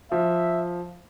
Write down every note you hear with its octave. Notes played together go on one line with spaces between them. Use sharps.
F3 E5